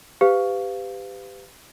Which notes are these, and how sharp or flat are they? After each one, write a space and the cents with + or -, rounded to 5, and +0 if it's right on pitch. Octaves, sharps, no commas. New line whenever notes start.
G4 +10 B4 +35 F5 +0